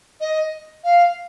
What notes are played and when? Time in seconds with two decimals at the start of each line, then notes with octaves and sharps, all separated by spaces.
0.20 D#5
0.83 F5